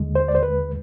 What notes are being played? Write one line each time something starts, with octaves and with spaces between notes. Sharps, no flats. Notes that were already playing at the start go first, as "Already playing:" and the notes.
Already playing: D#2 D3 G#3
C5
D5
C5
B4